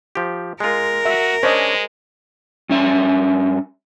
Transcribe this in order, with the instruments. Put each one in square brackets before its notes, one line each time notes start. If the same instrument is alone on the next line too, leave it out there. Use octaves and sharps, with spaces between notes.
[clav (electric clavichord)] F3 G4
[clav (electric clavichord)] G#3 F4 [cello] A#4
[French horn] F#4 [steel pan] E5
[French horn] G#3 [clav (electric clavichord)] C#4 D4 [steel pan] C5 D#5
[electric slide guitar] G2 C#4 E5